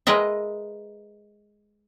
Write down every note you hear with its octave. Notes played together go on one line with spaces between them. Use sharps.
G#3 A#4 B4 D#5 E5